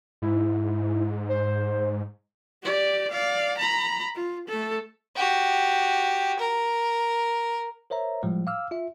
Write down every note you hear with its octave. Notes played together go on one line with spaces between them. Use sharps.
G#2 E4
C5
G4 D5
D5 F5
A#5 B5
F4
A3 A4
F#4 G4
A#4
A#4 C5 C#5 E5 A#5
A2 F3 G3 G#3
F5 D6 E6 F6
F4 E5